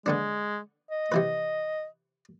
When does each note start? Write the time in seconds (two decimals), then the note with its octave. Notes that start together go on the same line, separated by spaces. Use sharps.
0.06 D3 G#3 B3 D4
0.91 D#5
1.12 C3 E3 B4